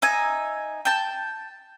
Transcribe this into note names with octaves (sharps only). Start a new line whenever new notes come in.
D#4 E5 G#5
G5 A5